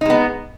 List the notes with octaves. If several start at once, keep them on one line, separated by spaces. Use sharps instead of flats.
G#3 B3 D#4